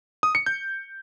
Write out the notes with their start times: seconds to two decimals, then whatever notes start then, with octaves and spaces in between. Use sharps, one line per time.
0.23 D#6
0.35 C#7
0.46 G6